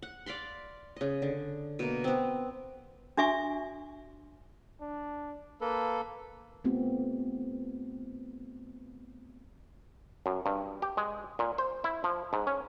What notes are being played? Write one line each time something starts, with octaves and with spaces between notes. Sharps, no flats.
F#5
D5 F5 B5 C6
C#3 D#5
D3
B2 A#3
B3 C4
D4 F#4 E5 G#5 C#6
D4
A#3 A4 B4
A3 B3 C4 F4 G4
F#2
G2
G4
G#3
A#2
C5
E4
F3
G#2
C#4